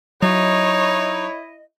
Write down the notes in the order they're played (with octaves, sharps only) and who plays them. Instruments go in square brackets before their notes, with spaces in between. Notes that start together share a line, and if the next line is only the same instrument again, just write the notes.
[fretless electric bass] F#3 [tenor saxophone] D#4 [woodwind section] E4 D#5 [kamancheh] C#5